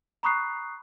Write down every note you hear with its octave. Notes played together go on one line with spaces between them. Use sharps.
A#5 B5 C#6 D#6 F#6 C7